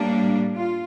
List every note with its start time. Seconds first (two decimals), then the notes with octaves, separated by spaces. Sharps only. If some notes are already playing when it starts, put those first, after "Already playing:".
Already playing: A2 G3 A#3 D4
0.56 F4